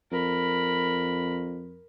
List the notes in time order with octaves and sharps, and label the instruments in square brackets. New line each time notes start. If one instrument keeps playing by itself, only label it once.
[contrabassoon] F2 [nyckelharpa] A#4 B5